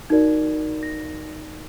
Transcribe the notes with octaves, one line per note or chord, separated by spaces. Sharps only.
D#4 F#4 A#4 D5 G#6
A#6